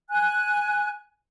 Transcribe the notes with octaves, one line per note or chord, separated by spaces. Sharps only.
G#5 F#6